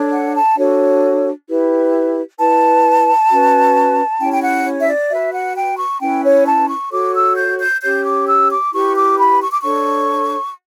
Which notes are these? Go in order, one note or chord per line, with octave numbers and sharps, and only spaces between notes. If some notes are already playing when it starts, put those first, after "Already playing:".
Already playing: D4 A4 C#5
F#5
A5
D4 F#4 A4 C#5
E4 G4 B4
E4 B4 A5
C#4 F#4 B4
C#4 E4 G4 C#5 G5
G5
F#5
C#5
E5
D5
F#4 B4 E5
F#5
G5
C#6
C#4 E4 B4 G5
C#5
A5
C#6
F#4 A4 C#5 D6
E6
G6
G6
C#4 G4 C#5 G6
D6
E6
D6
E4 G4 B4 C#6
D6
B5
C#6
D6
D4 A4 C#5 C#6